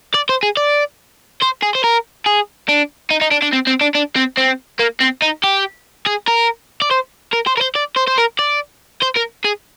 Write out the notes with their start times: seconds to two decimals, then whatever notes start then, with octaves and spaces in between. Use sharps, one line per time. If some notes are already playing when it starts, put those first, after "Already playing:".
0.15 D5
0.29 C5
0.43 G#4
0.57 D5
1.42 C5
1.62 G#4
1.75 C5
1.84 A#4
2.26 G#4
2.68 D4
3.11 D#4
3.22 D#4
3.32 D4
3.42 D4
3.53 C4
3.67 C4
3.81 D4
3.95 D4
4.16 C4
4.37 C4
4.79 A#3
5.01 C4
5.22 D#4
5.44 G4
6.06 G#4
6.27 A#4
6.82 D5
6.91 C5
7.33 A#4
7.47 C5
7.57 A#4
7.61 C5
7.76 D5
7.97 C5
8.08 C5
8.18 A#4
8.39 D5
9.02 C5
9.17 A#4
9.45 G#4